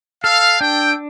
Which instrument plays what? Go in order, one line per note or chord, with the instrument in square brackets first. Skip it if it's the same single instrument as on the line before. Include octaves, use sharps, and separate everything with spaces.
[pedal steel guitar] A4 [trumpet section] F5
[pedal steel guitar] D4 [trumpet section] G5